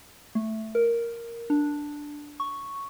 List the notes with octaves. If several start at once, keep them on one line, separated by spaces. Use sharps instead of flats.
A3
A#4
D4
C#6